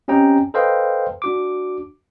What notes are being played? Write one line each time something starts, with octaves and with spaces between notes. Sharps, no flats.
C4 C#4 G4 D#5 G5 A#5
A4 B4 C5 D#5 F5 G5
D4 F#4 D6